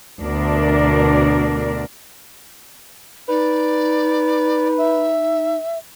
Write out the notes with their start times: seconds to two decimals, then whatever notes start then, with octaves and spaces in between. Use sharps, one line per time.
0.21 D2 B2 D4 A#4 D5
3.28 D#4 B4 D5
4.78 E5